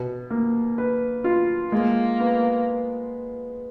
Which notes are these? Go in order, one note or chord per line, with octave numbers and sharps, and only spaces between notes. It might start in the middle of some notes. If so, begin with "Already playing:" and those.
Already playing: B2
A#3
B4
F4
G#3 A#3
B3